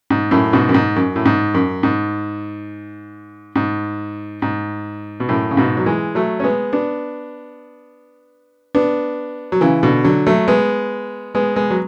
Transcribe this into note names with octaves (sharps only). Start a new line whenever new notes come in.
G#2
F#2 A2
G#2 B2
F#2
G#2
F#2
A2
G#2
F#2
G#2
G#2
G#2
B2
F#2 A2
C#3
G#2 B2
F#3
E3 G#3
F#3 A3
C#4
G#3 B3
B3 D4
B3 D4
F#3
C#3 E3
B2 D3
D3 F#3
F#3 A3
G#3 B3
G#3 B3
G#3 B3
F#3